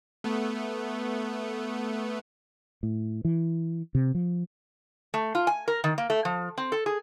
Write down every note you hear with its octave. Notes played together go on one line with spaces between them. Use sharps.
A3 B3
A2
E3
C3
F3
A3
F4
G#5
A#4
D#3
A#3
A3
F3
C4
A4
G#4